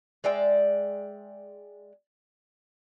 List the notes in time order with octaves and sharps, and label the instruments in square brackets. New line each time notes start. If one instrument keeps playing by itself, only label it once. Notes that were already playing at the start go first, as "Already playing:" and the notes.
[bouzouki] G#3 D5 E5 G5